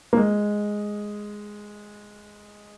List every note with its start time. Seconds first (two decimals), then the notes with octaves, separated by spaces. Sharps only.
0.13 A#3
0.17 G#3